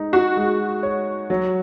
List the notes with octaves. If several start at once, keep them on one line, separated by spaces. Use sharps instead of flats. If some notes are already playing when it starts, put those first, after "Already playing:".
Already playing: G#3 D#4
F#4
G#3
C#5
F#3